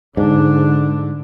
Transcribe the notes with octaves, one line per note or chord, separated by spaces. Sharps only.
G#2 D3 D4